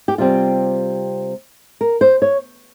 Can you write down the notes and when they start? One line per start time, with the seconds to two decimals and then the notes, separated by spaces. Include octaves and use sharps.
0.08 G4
0.18 C3 G3 C4 F4
1.81 A#4
2.01 C5
2.22 C#5